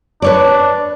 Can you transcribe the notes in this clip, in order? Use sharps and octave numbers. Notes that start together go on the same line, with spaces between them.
D4 B4 C#5 D5